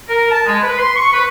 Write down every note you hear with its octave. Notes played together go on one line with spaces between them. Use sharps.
A#4
A5
G#3
B4
C6
C#6
B4